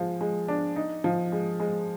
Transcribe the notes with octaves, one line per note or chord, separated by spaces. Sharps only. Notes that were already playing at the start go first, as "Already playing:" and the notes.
Already playing: F3 G#3
G#3
D4
D#4
F3
G#3
G#3